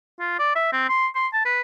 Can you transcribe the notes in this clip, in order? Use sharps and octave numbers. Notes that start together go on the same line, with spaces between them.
F4
D5
E5
C4
C6
C6
A5
B4